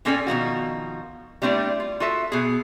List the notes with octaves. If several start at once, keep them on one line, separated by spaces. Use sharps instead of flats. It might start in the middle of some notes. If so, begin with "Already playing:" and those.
A#2 C4 C#4 A4 D5 G#5
B2 D#3 F3 F#4
G3 A3 C4 D4 E4
F4
F4 F#4 A4 E5 A5
B2 G#4